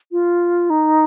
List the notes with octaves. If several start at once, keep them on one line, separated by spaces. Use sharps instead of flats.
F4
D#4